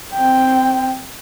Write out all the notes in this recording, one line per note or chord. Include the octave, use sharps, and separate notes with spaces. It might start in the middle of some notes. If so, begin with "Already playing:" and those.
C4 G5